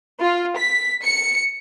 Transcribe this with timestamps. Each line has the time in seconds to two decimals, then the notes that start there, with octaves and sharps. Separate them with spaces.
0.22 F4
0.56 B6
1.04 C#7